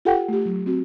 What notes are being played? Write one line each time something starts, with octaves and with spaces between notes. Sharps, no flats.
F4 G4 A4 F#5 G5
A3 G4
F#3
C4 F#4